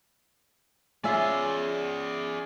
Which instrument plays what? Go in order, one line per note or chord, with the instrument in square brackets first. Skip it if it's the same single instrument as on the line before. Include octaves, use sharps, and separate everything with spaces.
[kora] C#4 F4 E5 [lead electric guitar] G#4 D5